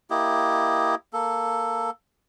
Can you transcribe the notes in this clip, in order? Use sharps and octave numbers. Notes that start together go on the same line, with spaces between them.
A#3 E4 G4 D#5
A#3 A4